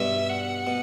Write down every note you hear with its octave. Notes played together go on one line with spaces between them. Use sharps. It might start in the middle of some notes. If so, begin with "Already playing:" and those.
Already playing: G2 B2 E5
F#5
B2